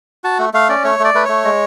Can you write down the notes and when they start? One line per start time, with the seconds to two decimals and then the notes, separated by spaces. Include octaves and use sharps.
0.24 F#4 A5
0.39 A3
0.54 A3 F5
0.69 C#4 D5
0.84 A3 C#5
0.99 A3 D5
1.14 A3 B4
1.25 A3 C#5
1.44 G#3